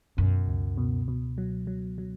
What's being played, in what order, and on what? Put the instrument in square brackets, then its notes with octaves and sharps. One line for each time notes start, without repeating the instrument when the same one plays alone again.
[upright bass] F#2 [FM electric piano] B2
[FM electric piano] C#2
B2
B2
F#3
F#3
F#3